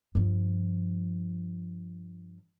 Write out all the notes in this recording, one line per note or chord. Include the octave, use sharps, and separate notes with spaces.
G2 F3